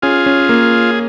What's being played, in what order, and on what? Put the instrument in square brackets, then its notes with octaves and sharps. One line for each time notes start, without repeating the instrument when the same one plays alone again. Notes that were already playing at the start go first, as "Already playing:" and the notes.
[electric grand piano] C#4 [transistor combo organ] F4 G#4
[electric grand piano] C#4
A#3